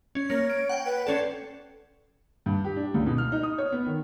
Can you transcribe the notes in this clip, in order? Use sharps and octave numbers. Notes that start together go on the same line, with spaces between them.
C#4
A#3 C#5
D7
F#5 G5
B4
C4 C#4 A4 D5
G2
G4
D4
C#2
B2
F6
D#4
D#6
C#5
B3
D#3